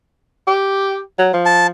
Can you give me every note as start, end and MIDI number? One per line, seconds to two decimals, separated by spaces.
0.47 0.99 67
1.18 1.32 54
1.33 1.70 53
1.46 1.67 81